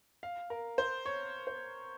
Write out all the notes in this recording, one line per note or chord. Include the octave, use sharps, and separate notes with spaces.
F5
A#4
C5
C#5
C5